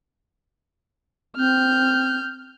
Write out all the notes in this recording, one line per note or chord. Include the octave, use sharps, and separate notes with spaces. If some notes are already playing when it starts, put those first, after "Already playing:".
C4 F6 G6